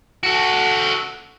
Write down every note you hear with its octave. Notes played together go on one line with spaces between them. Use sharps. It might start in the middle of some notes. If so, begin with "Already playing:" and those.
F#4 A4